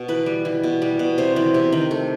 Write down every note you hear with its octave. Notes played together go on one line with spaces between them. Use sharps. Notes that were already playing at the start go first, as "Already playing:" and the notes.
Already playing: B2
E3 B4
G3
E3
B2
G3
B2
C3 C5
E3
C3
D#3
A3